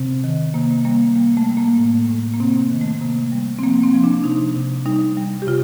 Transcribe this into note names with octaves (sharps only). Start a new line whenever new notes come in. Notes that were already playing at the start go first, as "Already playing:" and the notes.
Already playing: C3 C4
D#3
C3 A#3
G3 A#3
G3 A#3
A3
G3
A#3
A2
A2
A#3
C3 C4
D#3
A3
C3 A#3
G3
C4
F3 A#3
C4
F3
D4
C3 D#4
C3
G3 D#4
G3
G4
C3 F4